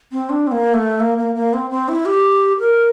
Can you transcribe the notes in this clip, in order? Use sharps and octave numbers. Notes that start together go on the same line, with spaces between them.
C4
D4
C4
A#3
A3
A#3
A#3
A#3
C4
C4
E4
G4
A#4